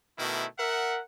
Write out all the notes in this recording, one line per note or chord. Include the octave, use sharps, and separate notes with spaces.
B2 D#3 A3 E4
A#4 E5 F#5